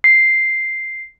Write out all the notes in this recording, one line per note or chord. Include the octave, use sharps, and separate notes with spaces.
C7